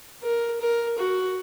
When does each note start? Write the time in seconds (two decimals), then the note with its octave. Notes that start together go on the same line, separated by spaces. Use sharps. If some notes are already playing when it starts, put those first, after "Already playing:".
0.23 A#4
0.61 A#4
0.99 F#4